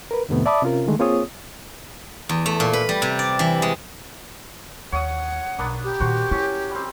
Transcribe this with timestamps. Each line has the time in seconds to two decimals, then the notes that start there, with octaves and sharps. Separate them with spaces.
0.11 A#4 B4
0.29 F2 A2 C3 D#3 A3 B3
0.46 D5 E5 A5 B5 D6 D#6
0.62 C3 C#4 F4 A#4
0.87 D3 D#3 G#3 A3
0.99 A#3 C4 F4 G#4 C#5 D#6
2.29 E2
2.46 A3
2.60 A#2
2.73 B4
2.89 G3
3.02 C3
3.19 D5
3.39 E3
3.62 G#3
4.92 D#2 C#5 F5 F#5 D#6
5.59 B1 A#3 B3 D4
5.84 G4
6.00 A#2 D#3 F#4 C5
6.31 C#4 E4
6.71 G3 C4